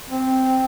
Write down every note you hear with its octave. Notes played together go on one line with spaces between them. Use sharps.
C4